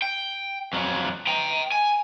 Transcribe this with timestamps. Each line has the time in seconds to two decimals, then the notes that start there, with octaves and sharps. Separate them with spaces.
0.02 G5
0.73 F2 F#3
1.27 G5 A#5
1.72 G#5